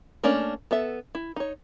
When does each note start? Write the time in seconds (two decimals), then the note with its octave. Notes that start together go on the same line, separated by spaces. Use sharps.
0.23 A3 A#3 C#4 D4 A#4
0.71 B3 A4 E5
1.15 E4
1.36 D#4 C#5